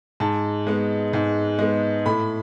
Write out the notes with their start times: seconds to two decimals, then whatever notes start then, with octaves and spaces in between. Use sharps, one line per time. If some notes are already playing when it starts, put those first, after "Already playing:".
0.20 G#2 A5
0.67 G#3 B3
1.13 G#2
1.59 G#3 B3
2.06 A2 B5